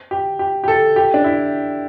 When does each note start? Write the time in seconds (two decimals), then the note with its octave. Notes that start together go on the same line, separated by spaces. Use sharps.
0.11 G4
0.39 G4
0.64 G4
0.68 A4
0.96 G4
1.14 D4
1.24 E4